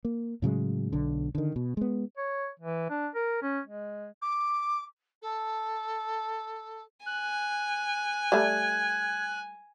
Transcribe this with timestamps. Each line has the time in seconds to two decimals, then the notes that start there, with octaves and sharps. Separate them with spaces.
0.05 A#3
0.42 A2 C#3 F#3 G#3
0.92 B1 D3
1.35 D3 D#3
1.56 B2
1.77 G#3 B3
2.18 C#5
2.60 E3
2.90 D4
3.15 A#4
3.42 C#4
3.67 G#3
4.22 D6
5.22 A4
7.06 G#5 F#6
8.32 G3 A3 G#6